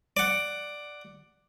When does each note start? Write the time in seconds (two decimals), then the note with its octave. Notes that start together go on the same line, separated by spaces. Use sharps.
0.17 D5 F#5